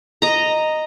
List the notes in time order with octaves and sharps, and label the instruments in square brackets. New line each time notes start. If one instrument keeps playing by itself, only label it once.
[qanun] D#5 A#5